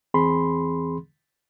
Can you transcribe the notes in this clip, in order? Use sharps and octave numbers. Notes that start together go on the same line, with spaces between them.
E2 E3 C4 G#4 B5 C6